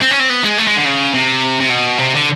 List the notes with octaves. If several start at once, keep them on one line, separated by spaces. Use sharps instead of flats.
C4
C#4
C4
B3
G#3
A3
G#3
D3
C#3
C3
C3
B2
C3
D3